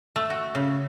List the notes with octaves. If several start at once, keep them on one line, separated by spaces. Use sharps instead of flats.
A3
F#4
C#3